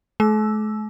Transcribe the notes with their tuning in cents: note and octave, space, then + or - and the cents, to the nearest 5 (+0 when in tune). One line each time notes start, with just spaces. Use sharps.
A3 -45 E6 +0